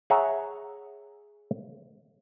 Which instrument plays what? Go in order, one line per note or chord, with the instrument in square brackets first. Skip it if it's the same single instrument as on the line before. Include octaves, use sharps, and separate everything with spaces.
[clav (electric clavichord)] G#4 C#5 E5 F#5 A#5